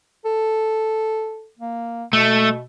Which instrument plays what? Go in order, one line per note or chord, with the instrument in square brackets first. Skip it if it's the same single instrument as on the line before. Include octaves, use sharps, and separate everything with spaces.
[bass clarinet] A4
A#3
[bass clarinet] B2 [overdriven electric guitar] A3